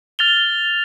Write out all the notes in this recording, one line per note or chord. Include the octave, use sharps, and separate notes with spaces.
F6 A6 F7 G7